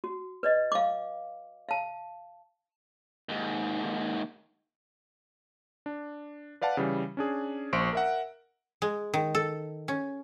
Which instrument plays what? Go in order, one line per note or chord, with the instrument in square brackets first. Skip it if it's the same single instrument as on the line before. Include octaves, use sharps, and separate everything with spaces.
[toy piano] F#4
B4 D5 D#5
F5 D6
F5 A5
[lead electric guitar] D#2 G#2
[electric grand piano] D4
B4 D5 F5 F#5 A5
C#3 E3 G3
C#4 D4 G#4
A#1 C5 C6 C#6 D7
A#4 E5 F#5
[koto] G#3
D#3
A4
C#4